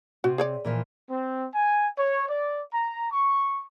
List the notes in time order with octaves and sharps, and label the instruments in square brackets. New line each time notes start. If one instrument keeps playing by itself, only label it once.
[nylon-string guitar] C3 C4 [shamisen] F#4
[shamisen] G#4 C#5 D5
[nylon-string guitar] A#2 E3 F3
[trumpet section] C4
G#5
C#5
D5
A#5
C#6